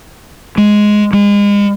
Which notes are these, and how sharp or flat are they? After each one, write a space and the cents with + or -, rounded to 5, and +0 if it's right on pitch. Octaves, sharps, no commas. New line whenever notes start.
G#3 +5
G#3 -35